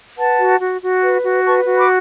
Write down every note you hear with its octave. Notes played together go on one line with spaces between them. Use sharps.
B4 F#5 A5
F#4
F#4
F#4
B4
F#4
B4 A5 C#6
F#4
B5 D6